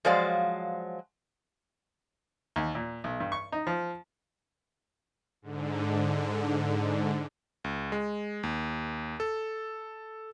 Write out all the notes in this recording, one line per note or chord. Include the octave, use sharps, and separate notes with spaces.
F3 F#3 G#3 C5 D5 F5
D#2
A#2
B1
G2
C#6
D#4
F3
G#2 D3
C#2
G#3
D#2
A4